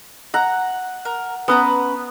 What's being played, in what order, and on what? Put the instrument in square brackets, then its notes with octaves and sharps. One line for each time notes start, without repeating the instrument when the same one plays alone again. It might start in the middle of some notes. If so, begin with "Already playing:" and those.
[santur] F#5 [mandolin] A#5
[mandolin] A#4
[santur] B3 [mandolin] C#4 B4 A#5